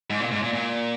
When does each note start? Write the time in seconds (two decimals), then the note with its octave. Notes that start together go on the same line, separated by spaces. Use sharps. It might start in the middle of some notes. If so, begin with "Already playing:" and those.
0.10 G#2
0.20 A#2
0.31 G#2
0.42 A#2
0.53 A#2